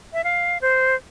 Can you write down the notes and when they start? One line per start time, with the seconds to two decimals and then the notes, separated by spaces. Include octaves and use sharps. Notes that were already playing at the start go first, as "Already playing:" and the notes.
0.13 E5
0.24 F5
0.61 C5